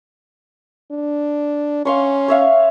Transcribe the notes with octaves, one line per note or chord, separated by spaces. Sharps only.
D4
C#4 F5 C6 C#6
C#5 E5 F5